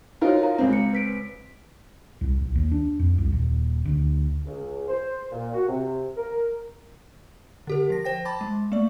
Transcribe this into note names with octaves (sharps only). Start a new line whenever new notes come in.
D#4 F4 F#4 A#4 C5 C#5
C5 F5 A#5
C#2 C4
C#7
B4 B6 D7
C2
B1
D#2
D4
F2
C2
D#1
D2
C#2
C5
A#2
F#4
C3
A#4
D3 G4 A#4
F3 A#6
C5 G5 A#6
A5 B5 D6 A6
G#3
A3 A#3 D5